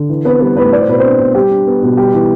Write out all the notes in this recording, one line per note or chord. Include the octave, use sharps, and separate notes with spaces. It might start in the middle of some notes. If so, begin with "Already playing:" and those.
Already playing: D3
E3
B3 C4 B4
G3 B3 B4
A2 B3 B4
B3 D5
C5
B2 B4
C4 C5
D4
B2
G3 G4
D4
B3
B2
G3 G4
E3